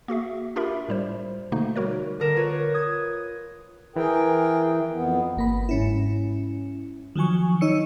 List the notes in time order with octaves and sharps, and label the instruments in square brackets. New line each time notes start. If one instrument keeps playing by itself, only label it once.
[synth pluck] A#3 F#4 G#4 E5
D4 F4 G4 A#4 E5 B5
A2 G3 C5
B2 D3 A3 A#3 D#4
G3 F#4 A#4 C#5
[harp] D3 A#4 E7
F4 B4 C#5
D#6 G#6
[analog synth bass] E3 [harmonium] G#4 A#4 G5
[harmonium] F2 B3
[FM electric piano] G1 A#3 B5
G#2 C#4 E4
D#3 F3 F#3 G#5 C#6
D#4 C#5 E6 C#7